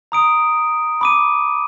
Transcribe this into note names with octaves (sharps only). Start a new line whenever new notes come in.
A#5 D#6 D7
B5 D6 D#7